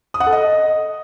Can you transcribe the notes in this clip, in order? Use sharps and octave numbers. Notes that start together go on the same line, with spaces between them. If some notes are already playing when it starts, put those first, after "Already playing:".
D#6
F#5
A4
D#5